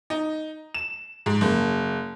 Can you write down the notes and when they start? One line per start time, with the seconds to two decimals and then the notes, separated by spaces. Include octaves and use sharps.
0.10 D#4
0.74 E7
1.26 G#2
1.41 F#1